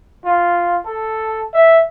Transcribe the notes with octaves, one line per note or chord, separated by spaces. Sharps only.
F4
A4
E5